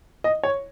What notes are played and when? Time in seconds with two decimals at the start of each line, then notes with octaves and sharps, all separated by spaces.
0.24 D#5
0.43 C#5